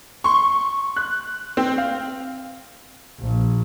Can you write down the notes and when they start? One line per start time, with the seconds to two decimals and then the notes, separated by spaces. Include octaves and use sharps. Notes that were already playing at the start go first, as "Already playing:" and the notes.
0.24 C6 C#6
0.96 F#6
1.57 C4
1.78 F5
3.20 A#1